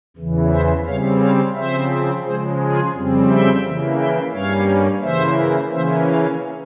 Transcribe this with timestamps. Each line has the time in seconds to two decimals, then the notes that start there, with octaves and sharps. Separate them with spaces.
0.17 E2 C#3 E3
0.51 C5 E5
0.85 C#3 G3 C4 C#5 F5
1.20 C#5 F5
1.55 C#3 F3 C4 C5 E5
2.24 C#3 F3 G#3 G#4 C5
2.59 F4 G#4
2.94 F2 C#3 G3 C4
3.28 E5 G5
3.63 C#3 E3 A#3
3.97 E5 G5
4.32 G2 G3 A#3 C#4 C#5 F5
5.02 C#3 E3 A#3 C5 E5
5.71 C#3 E3 A#3 C#4 C5 E5
6.06 C#5 F5